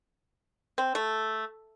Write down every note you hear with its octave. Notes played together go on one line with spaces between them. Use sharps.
C4
A3